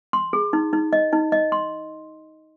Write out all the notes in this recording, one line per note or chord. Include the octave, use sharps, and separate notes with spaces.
C6
G#4
D#4
D#4
D#5
D#4
D#5
C6